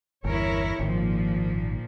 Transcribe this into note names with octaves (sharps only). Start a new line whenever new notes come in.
G1 E2 E4 A#4 C#5
G#1 A#2 D#3 F3